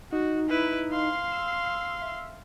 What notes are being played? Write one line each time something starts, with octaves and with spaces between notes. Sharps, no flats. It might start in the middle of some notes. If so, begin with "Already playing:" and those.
D#4 F#4
E4 B4
F5 C6
E6
E5